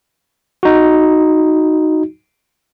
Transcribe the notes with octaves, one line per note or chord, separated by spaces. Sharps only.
D#4 F#4